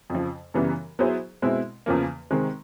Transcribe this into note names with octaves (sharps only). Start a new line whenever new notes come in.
F2 C#3 F3
F#2 C#3 E3 G3 B3
F#3 B3 E4 G#4 C5
B2 G#3 C4 E4
E2 C#3 F3 A#3
C3 D#3 G#3 C4